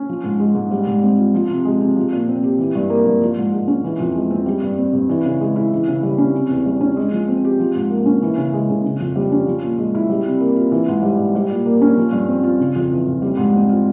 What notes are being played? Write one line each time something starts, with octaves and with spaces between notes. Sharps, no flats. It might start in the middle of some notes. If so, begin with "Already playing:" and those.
Already playing: C#4
F3
G#2
G#3
G#2
G3
G#2
C4
F4
F3
C3
G#3
C3
F3
A#2
C4
G4
E3
G2
A#3
G2
F3
G#2
G#3
C#4
E3
F2
G#3
C4
G3
G2
C4
G2
E3
C#3
G#3
E4
E3
C#3
G3
C#4
C3
E2
G3
C#4
G#3
F3
C4
G4
F3
G#2
A#3
C#4
E3
C#3
G#3
C#3
C#3
F2
G3
C#4
F3
A#2
G#3
E4
G3
C3
A#3
F4
E3
G#2
G3
G#2
G3
A#2
A#3
C#4
F3
G2
C4
F4
C#3
F2
E3
F2
G3
G#2
C4
F4